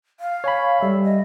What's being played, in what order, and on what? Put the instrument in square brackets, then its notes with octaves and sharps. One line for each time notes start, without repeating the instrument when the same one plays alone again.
[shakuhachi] F5
[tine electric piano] C#5 G#5 B5
[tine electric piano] G3 E5 [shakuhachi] A4
[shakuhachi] D#5